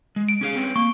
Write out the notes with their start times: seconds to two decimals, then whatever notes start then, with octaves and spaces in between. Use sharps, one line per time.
0.16 G#3
0.29 D7
0.41 C#4 G#4 F5
0.56 C4 C#4 B4
0.76 A#3 C#6